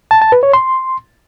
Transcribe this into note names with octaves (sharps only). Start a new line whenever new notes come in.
A5
A5
B4
C#5
C6